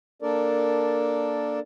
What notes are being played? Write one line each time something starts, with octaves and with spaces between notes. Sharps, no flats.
A#3 D4 A4 A#4 D5